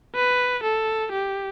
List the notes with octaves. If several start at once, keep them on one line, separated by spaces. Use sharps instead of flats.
B4
A4
G4